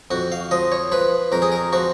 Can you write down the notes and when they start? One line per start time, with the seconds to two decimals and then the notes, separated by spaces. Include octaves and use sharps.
0.11 F2 F#4
0.32 F5
0.51 F3 D#5
0.72 C#5
0.92 F3 B4
1.32 F2 A#4
1.42 G#4
1.52 A#4
1.73 F3 F#4